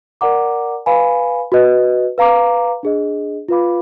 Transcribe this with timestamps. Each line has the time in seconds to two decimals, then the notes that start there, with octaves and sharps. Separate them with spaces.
0.21 A#4 D5 F#5 A#5 D6
0.86 B4 F5 G#5 B5
1.52 F#4 B4 D#5
2.18 B4 F5 A#5 D6
2.83 D4 G#4 D#5
3.48 F4 B4 F5 B5 D6